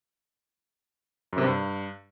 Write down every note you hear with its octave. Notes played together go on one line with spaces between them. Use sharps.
F#2
C3
G2